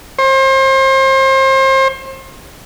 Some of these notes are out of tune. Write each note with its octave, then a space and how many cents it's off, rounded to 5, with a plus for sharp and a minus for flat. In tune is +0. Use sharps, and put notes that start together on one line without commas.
C5 +35